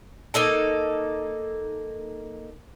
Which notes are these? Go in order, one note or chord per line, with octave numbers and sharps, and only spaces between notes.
A#3 D#4 A4 A5